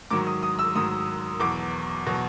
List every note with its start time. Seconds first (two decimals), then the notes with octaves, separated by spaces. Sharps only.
0.11 G#2 D#3 F#3 D6
0.27 D#6
0.43 D#6
0.59 E6
0.75 G#2 D#3 F#3 D#6
1.40 E2 B2 F#3 D6
2.06 B2 F#3